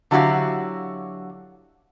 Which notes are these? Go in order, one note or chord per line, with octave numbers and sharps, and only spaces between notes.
D3 F#3 E4 F#4 G4 F5